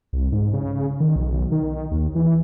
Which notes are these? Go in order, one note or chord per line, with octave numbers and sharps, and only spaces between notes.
C2
G#2
C#3
D#3
B1
D#3
D#2
E3